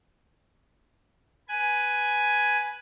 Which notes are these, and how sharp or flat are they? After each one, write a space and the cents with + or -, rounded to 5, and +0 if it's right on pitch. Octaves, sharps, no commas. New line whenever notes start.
B4 +0 G#5 +5